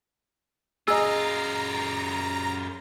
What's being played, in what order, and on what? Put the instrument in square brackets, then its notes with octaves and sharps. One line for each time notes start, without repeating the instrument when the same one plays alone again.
[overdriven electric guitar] F#2 F4 [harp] G#4 D#5 [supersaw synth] A#5 [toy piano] E6